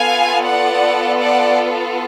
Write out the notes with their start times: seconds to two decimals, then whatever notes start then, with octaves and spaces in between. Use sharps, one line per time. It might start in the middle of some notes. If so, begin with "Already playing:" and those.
Already playing: B3 F4 A4 F5 G#5
0.44 D5 F#5
1.21 D5 F#5